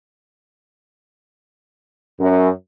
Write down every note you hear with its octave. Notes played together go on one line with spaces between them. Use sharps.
F#2